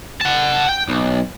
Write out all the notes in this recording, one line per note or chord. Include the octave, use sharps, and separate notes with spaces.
F#5 A5
G5
B1